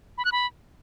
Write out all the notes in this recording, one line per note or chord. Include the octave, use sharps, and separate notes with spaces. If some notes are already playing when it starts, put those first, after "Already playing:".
B5
F#6
B5